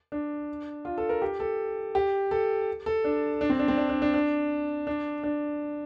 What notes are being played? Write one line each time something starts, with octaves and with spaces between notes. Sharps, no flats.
D4
F4
A4
A#4
G4
A4
G4
A4
A4
D4
D4
C4
D4
C4
D4
D4
D4
D4
D4
D4